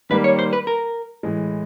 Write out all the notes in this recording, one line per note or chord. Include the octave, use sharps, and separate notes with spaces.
D#3 G3 A#3 B4
C#5
C5
B4
A#4
A2 E3 G#3